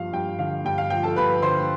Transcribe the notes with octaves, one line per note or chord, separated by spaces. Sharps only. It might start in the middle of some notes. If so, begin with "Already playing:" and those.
Already playing: G2 F3 F5
G2 G5
D3 F5
G2 G5
F5
F3 G5
A4 A5
G2 B4 B5
D3 C5 C6